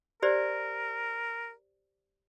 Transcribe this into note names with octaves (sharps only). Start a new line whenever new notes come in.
G4 A#4 C5 D5